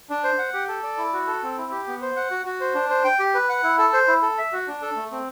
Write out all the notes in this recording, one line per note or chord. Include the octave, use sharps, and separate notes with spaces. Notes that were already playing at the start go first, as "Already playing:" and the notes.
D4
C5
F#5
G4
A4
D5
E4
F#4
A4
C4
E4
G4
B3
C5
F#5
F#4
F#4
C5
D4
C5
G5
G4
B4
F#5
E4
A4
C5
E4
A4
E5
F#4
D4
A4
A3
C4